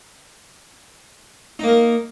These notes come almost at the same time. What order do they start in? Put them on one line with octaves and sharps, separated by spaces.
D#4 A#3 A#4